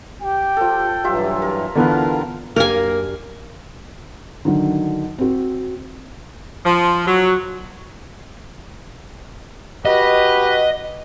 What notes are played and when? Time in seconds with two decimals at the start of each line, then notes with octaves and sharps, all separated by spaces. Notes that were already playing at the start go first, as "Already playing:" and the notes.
0.22 G4 G5
0.57 F3 A4
1.04 G2 E3 F#3 F4 G4 E5
1.42 A#4
1.75 D3 E3 B3 F4 A#4 D5 F5 A5
2.56 F#2 A#3 D4 G4 A#4 G#5
4.45 D3 D#3 F#3
5.19 C4 F#4
6.65 F3
7.06 F#3
9.85 F#4 G4 B4 D#5